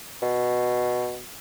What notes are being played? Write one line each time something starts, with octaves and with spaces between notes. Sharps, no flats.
B2